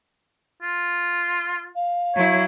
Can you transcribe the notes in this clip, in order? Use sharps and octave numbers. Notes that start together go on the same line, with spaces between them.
F4
F5
F#3 E4 C#5